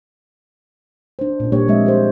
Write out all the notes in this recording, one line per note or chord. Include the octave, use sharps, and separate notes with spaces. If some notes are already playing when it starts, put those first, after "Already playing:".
D4 C5
A#2 C#4
A#2 G3 A#3 D4 G4 C#5
A#2 F3 G#3 C4 D#5 E5
C4 G4 C5